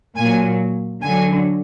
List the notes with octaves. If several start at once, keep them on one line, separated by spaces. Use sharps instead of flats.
A#2 F#3 G#5
D3 F#3 G#5